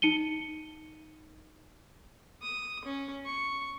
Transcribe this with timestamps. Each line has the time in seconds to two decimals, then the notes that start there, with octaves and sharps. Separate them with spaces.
0.02 D#4 C#7 D#7 G7
2.42 D#6
2.85 C#4
3.26 C#6